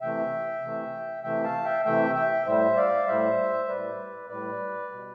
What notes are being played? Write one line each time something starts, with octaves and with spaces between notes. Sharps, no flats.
C3 E3 A3 E5 G5
C3 E3 A3
C3 E3 A3 E5 G5
F5 A5
E5 G5
C3 E3 A3 E5 G5
E5 G5
A2 G3 C5 E5
D5 F5
A2 G3 C5 E5
A2 G3 B4 D5
A2 G3 B4 D5
B2 G3